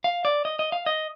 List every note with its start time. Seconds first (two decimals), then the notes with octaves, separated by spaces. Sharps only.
0.04 F5
0.25 D5
0.45 D#5
0.59 D#5
0.72 F5
0.86 D#5